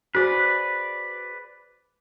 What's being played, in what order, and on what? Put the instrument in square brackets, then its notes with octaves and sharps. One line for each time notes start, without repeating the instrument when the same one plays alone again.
[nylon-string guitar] F#4 G#4 C5 [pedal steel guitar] B4 D5